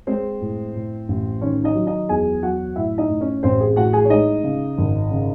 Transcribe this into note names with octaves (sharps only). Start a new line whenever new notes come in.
G#3 C4 C5
A2
A2
A1
D#3 C#4 C#5
D#4 D#5
F#3
D#4 D#5
E2 G#4 G#5
F#3 F#4 F#5
A2 E4 E5
D#4 D#5
A2
C#4 C#5
A1 C4 C5
G#4
A2 F#4 F#5
G#4 G#5
C#5
G#3 D#4 D#5
C#3
G#1
C#3